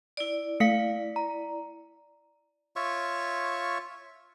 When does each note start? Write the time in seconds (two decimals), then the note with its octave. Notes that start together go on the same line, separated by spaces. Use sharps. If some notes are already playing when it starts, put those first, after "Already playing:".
0.17 E4 D5
0.60 A3 F5 B6 C#7
1.16 A#5
2.76 F4 C#5 E5 C#6